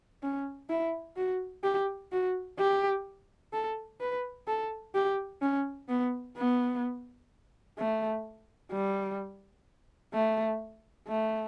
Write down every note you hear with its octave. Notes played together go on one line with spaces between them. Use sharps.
C#4
E4
F#4
G4
F#4
G4
A4
B4
A4
G4
C#4
B3
B3
A3
G3
A3
A3